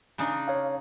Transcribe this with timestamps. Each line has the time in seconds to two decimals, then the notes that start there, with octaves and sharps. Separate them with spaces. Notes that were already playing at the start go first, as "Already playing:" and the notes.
0.18 C#3 D4 D#4
0.48 C#5 F5